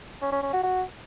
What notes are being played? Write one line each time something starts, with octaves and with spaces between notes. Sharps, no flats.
C#4
C#4
C#4
F#4
F#4